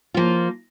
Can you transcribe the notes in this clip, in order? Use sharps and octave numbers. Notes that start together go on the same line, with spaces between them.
F3 A#3 F4